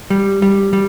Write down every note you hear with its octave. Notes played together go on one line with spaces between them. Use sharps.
G3
G3
G3